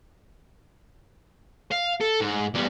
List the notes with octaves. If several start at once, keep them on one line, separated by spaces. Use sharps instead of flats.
F5
A4
G#2
E2 G3